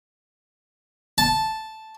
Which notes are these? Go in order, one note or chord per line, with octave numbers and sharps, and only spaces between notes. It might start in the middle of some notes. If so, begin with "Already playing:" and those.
A5